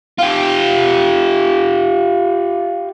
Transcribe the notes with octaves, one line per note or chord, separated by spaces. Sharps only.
F4 G4